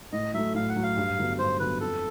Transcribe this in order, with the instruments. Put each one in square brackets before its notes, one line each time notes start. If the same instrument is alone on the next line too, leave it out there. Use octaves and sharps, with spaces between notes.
[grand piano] A2 [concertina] D#5
[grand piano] F#3 A3 [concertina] E5
[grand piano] A2 [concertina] F5
[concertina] F#5
[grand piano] F#3 A3
[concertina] F5
[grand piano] G2
D3 F#3 B3
[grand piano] G2 [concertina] C5
[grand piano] D3 F#3 B3 [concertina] B4
[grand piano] F2 [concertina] A4